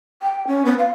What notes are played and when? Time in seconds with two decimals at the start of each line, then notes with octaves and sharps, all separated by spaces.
0.22 G5
0.47 C#4
0.65 B3
0.79 F5